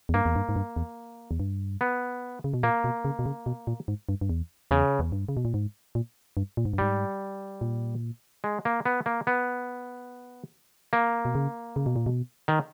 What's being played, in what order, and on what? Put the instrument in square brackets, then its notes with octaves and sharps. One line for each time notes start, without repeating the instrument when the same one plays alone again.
[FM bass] E2
[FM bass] G2 [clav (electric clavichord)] A#3
[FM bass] E2
G2
G#2
G2
E2
E2
G2
[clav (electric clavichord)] B3
[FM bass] C#3
B2
[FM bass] A#2 [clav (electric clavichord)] A#3
[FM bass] B2
C#3
B2
C#3
B2
A#2
G#2
G2
G2
E2
[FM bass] E2 [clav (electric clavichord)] C#3
[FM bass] E2
G2
C#3
B2
A#2
G#2
A#2
G2
A#2
G#2
G2
[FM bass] G#2 [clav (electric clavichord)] G3
[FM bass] A#2
[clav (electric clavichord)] G#3
A#3
B3
A#3
B3
A#3
[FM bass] B2
C#3
C#3
B2
A#2
B2
[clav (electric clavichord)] D#3